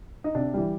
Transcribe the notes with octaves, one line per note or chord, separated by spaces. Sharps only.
D#4
C3 D4
E3 G3